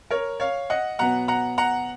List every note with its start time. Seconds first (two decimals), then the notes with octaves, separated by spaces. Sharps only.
0.10 A#4 C#5
0.40 C#5 F5
0.70 D#5 F#5
0.99 B2 F#3 B3 F#5 A#5
1.28 F#5 A#5
1.58 F#5 A#5